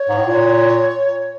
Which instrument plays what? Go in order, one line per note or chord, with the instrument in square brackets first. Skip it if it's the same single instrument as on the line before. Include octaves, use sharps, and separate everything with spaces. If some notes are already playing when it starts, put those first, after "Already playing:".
Already playing: [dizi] C#5
[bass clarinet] G#2
A2
A#2